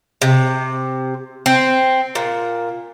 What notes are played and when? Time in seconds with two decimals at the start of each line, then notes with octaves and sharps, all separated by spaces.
0.22 C3
1.46 C4
2.15 A#2